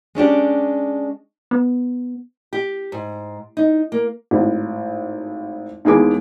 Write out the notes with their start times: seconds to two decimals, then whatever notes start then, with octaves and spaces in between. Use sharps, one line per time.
0.15 G#3 C#4 D4 G4
1.51 B3
2.53 G4
2.92 G#2
3.57 D#4
3.92 A#3
4.31 G#1 A2
5.85 D#2 E3 G#3 B3 G#4 D6